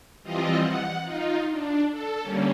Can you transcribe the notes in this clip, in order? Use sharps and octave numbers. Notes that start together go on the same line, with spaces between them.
E3 F3 G3 C4 F4 D#5
F#5
D#4 F4
D4
A4
D3 G3 A#3 C#4